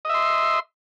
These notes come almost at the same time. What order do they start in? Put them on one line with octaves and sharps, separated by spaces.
D#5 E5 C6